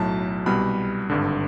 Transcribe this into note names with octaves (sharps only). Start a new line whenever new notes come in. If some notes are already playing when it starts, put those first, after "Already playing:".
Already playing: B1 A2 F#3 A5
C2 B2 G3 B5
G#1 G2 D3